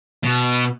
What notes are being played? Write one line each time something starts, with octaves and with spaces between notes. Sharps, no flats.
B2